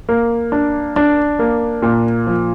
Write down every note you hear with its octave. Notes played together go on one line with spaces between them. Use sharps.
A#3
D4
D4
A#3
A#2
F3